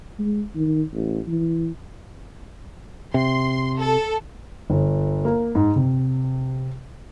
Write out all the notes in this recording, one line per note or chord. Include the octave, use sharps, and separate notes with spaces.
G#3
D#3
A1
E3
C3 C6
A4
G1
A#3
G#2
C3